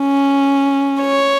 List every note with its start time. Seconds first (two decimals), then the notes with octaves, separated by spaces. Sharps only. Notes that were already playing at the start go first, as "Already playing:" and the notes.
Already playing: C#4
1.01 C#5